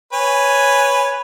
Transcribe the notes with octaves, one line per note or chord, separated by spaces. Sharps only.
B4 C#5 G#5